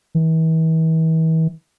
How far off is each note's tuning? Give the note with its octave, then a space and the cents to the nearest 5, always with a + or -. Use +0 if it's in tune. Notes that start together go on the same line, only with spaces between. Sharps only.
E3 -40